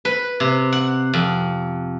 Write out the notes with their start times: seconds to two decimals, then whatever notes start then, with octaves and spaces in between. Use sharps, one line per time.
0.05 B4
0.40 C3
0.73 F#5
1.13 F2